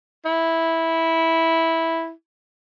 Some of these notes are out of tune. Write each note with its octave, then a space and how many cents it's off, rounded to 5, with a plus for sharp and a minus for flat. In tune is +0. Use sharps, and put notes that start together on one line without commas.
E4 -10